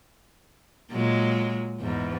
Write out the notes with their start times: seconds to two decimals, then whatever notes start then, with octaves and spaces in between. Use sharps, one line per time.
0.91 A#2 F#3 G#3
1.80 E2 G#2